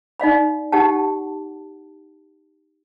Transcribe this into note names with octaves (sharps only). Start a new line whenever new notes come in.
D#4 D5 F5 B5
D#4 G4 F#5 A5